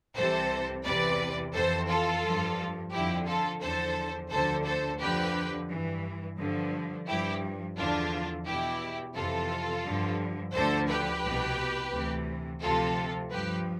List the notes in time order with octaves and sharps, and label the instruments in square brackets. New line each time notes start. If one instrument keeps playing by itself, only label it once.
[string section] C2 C3 E3 A4 C5
E2 C3 E3 B4 D5
F2 E3 A4 C5
F4 A4
G2 F3
F2 D3 F3 E4 G4
F4 A4
E2 D3 F3 A4 C5
D2 D3 F3 A4 C5
A4 C5
F2 D3 F3 G4 B4
G2 E3
G2 D3 F3
G2 F3 E4 G4
E2 D3 F3 D4 F4
E2 B2 E4 G4
F2 C3 E3 F4 A4
G2 D3 F3
D2 D3 F3 A4 C5
G4 B4
C2 B2
D2 C3 E3
D2 C3 F3 F4 A4
G2 F3 G4 B4